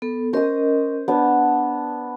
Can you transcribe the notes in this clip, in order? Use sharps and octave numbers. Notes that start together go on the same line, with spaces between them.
B3 A4
C#4 A#4 C5 D#5 D#6
B3 D4 A5